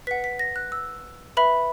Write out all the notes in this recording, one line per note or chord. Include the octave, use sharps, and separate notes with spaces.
B4 F#5 B6
B6
A#6
F#6
E6
B4 E5 B5